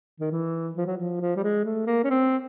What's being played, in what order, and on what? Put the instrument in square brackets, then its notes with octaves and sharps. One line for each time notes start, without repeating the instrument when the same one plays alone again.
[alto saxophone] D#3
E3
F3
F#3
F3
F3
G3
G#3
A3
A#3
C#4
C4